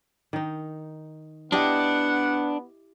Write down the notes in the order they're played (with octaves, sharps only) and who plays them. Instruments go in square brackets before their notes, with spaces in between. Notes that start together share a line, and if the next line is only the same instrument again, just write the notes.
[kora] D#3 D#4
[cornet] B3 [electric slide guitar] D4 [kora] E4 G4 D#5 [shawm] F#5